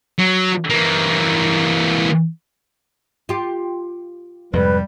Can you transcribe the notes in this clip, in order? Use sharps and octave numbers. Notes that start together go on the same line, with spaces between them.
F#3
E3 A#3
F4 G4
F2 G#2 C3 G3 B4